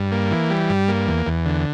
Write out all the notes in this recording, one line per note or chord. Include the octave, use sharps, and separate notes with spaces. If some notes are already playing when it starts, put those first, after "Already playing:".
Already playing: G2
A#3
E3
G3
G2
A#3
E2
E2
D3